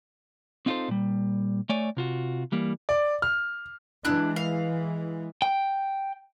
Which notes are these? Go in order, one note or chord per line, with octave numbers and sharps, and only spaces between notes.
C4 D#4 F4 G4 A4 C5
A#2 G3
A3 C#5 D5 G#5
C3 F4 F#4
E3 G3 A#3
D5
F6
E3 G#3 D4 E4 F#6
F5
G5